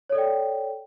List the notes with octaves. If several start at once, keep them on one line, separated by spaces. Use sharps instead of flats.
A4 C#5 D5 G5